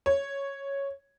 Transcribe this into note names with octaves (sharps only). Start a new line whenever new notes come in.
C#5